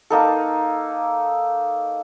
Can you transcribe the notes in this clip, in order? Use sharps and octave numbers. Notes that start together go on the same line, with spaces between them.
A#3 D#4 A4